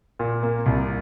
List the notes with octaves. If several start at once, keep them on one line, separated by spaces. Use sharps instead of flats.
A#2
A#3
C2